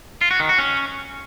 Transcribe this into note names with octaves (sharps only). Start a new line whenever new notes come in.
F4
F#4
D#3
F#4
C#4